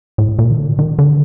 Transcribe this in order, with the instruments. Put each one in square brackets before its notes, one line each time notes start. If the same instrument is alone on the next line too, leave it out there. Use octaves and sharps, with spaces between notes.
[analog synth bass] A2
A#2
D#3
D3
D#3
D3